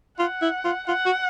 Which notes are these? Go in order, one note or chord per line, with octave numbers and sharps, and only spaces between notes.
F4 F#5
E4
F4
F4 F#5
F#4